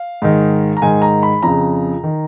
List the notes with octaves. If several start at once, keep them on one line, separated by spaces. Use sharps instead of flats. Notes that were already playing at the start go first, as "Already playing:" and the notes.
Already playing: F5
G#2 D#3
A#5
G#2 D#3 G#5
A#5
B5
F2 C#3 A#5
D#3